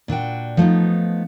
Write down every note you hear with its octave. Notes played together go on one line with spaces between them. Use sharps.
A#2 D4 F#4 G5
F3 A3 B3 D#4